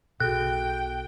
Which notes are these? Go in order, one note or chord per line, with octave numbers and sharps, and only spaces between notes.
B1 B2 F#4 G#4 A4 G5 F#6